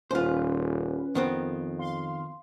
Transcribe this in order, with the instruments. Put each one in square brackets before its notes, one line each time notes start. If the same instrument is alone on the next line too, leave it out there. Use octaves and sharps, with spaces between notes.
[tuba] D#1 [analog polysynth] C#4 B4 [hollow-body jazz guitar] F4 C5
[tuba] F2 [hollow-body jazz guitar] D#3 B3 C4
[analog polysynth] F5 C6